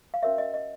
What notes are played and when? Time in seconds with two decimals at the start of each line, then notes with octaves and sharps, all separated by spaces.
0.14 F5
0.23 C#4 F#4 A#4 C#5 E5
0.38 D#5
0.54 D#5